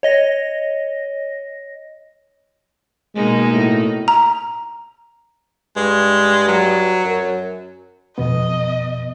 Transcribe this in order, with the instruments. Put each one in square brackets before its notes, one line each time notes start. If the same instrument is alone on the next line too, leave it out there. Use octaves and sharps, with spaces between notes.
[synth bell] C#5 D#5 A#6
[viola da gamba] B2 A#3 D#4 [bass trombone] G#3
[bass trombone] A2
[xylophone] A#5
[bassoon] G2 [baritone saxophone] G#3
[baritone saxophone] F#3
[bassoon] F#2
[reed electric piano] F2 B2 B3 [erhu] D#5